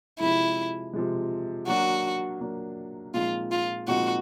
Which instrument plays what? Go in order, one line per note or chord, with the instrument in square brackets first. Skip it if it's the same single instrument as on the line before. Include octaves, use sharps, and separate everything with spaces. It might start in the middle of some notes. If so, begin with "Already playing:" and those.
[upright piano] C3 F3 G#3 [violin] E4
[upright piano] C3 F3 G#3
[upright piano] F#3 A#3 D4 [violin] F#4
[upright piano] F#3 A#3 D4
[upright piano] A#2 F3 G#3 C4 D#4 [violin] F4
[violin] F4
[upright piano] A#2 F3 G#3 C4 D#4 [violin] F#4